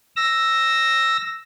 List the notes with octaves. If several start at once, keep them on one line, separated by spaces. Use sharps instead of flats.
E6 A#6